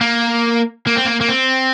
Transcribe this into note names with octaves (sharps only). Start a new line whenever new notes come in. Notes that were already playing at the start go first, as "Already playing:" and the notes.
A#3
A#3
C4
A#3
A#3
C4